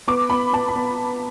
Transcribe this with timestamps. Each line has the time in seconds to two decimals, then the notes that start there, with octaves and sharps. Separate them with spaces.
0.08 B3 D6
0.30 B3 B5
0.53 B3 A5
0.68 B5
0.75 B3